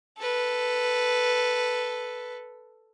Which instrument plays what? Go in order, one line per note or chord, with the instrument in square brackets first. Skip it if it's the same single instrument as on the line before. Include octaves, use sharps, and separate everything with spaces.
[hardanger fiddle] A4 B4